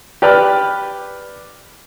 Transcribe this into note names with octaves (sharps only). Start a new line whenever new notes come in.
G4 B4 D5 F6